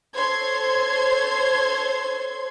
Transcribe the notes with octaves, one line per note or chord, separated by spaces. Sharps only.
A4 C5 C#5 C6 G#6